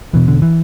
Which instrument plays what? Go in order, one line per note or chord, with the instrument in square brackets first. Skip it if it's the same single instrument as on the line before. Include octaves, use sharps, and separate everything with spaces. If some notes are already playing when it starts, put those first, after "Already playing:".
[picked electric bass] E1 E2 B2 E3
D3
E3